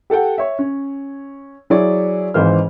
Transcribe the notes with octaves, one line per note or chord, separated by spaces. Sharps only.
G4 A4 F#5 G5
C#5 E5
C#4
F#3 E4 G#4 C#5 D5
G#1 G#2 E3 C5 F6